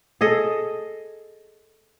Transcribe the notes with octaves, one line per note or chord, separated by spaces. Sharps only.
G#4 A4 D#5